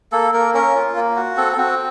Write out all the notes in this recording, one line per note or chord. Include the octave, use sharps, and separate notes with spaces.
A#3 A4
A#3 A#4
C#4 A#4
F4
A#3
F#4
C4 A4
A4
C4 F#4